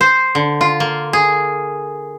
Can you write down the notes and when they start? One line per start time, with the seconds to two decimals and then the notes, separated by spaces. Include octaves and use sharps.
0.01 C5
0.35 D3
0.61 F4
0.80 A#3
1.13 G#4